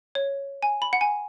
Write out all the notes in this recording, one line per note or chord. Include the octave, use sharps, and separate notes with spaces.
C#5
G#5
B5
F#5
G#5